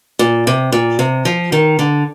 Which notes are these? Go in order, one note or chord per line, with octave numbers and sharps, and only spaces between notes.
A#2
C3
A#2
C3
F3
D#3
D3